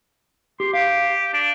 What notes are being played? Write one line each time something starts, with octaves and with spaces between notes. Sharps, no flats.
G4 C6
G4 F5
D4